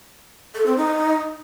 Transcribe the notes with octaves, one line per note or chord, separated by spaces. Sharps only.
A4
C4
D#4